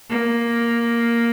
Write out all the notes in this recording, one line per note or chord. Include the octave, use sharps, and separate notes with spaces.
A#3